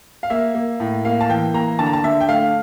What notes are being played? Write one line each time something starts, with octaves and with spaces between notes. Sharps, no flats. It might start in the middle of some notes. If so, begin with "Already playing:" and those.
F5
A#3 E5
A#3
A2
A#3 F5
A5
E3 G5
A#3 A#5
D3 A5
A#5
A5
D3 E5
G5
A3 F5